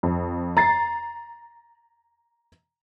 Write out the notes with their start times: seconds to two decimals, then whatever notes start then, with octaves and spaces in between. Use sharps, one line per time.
0.03 F2
0.57 A#5 A6 C7